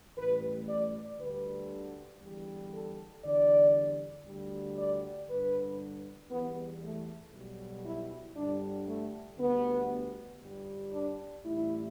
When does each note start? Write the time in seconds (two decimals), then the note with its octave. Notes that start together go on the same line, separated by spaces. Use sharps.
0.16 A1 A2 G3 B4
0.68 D5
1.18 D2 D3 G3 B4
2.22 E2 D3 G3
2.72 A4
3.24 E2 D3 G3 D5
4.26 D2 D3 G3
4.77 D5
5.29 G1 G2 D3 B4
6.31 E2 E3 G3 B3
6.82 A3
7.33 B1 B2 G3
7.84 E4
8.36 G1 G2 D3 G3 D4
8.87 A3
9.38 D2 D3 G3 B3
10.40 G1 G2 G3
10.91 D4
11.43 A1 A2 G3 E4